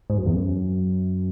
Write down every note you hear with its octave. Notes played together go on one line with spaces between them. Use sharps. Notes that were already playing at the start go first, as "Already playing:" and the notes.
G#2
F#2
E2
F#2